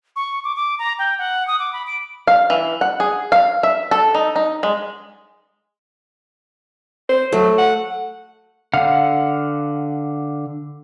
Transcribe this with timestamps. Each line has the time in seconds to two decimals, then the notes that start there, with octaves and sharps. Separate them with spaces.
0.16 C#6
0.44 D6
0.56 D6
0.79 A#5
0.99 G5
1.19 F#5
1.47 D#6
1.59 D6
1.73 B5
1.87 D7
2.27 F5
2.50 E3
2.81 F#5
3.00 G#4
3.32 F5
3.63 E5
3.91 A4
4.15 D#4
4.36 D#4
4.63 G#3
7.09 C5
7.32 F#3 A3
7.58 F#5
8.74 D3 F5 F#5